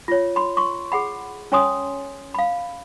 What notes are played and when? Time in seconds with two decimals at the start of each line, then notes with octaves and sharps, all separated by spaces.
0.08 F4 C#5
0.36 B5 C6
0.57 C6 C#6
0.92 G#4 F#5 B5
1.52 C#4 C#5 G#5 C6 D#6
2.34 F5 B5